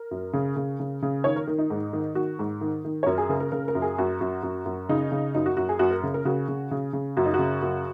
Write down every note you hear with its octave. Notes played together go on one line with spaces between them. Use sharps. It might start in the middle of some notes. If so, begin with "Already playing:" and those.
Already playing: A#4
F#2
C#3
C#3
C#3
C#3
D#3 C#5
A#4
D#3
D#4
G#2
D#3
D#3 F#4
G#2
D#3
D#3
C#5
F#2 A#4
G#4
C#3 A#4
A#4
C#3 A#4
A#4
F#2
G#4
F#2 F#4
F#2
F#2
F#2
C#3 D#4
C#3
F#2 D#4
F#4
F#2 F#4
G#4
F#2 F#4
A#4
C#3
A#4
C#3 F#4
C#3
C#3
C#3
F#2 F#4
D#4
F#4
C#3
F#2